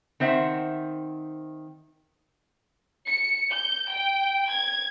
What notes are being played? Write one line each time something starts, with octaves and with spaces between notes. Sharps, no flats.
D#3 C4 C5 E5 F#5
C#7
G6
G5
G#6